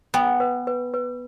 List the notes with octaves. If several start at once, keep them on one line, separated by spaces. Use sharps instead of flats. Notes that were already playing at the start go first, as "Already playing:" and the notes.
B3 G5
B4
B4
B4